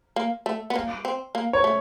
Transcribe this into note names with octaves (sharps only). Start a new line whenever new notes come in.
A#3
A3
B3
A#3
C4
A#3
C#5
A3